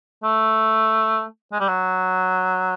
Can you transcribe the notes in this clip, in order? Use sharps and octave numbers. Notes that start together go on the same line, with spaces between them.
A3
G#3
G3
F#3